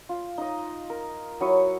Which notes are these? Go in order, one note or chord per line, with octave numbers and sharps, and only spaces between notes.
F4
D#4 D#5
A#4
F#3 E4 C#5 D#6